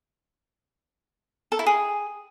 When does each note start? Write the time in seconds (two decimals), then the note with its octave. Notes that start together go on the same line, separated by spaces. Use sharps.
1.52 A4
1.59 E4
1.66 G#4